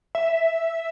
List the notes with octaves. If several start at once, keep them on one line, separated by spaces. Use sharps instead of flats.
E5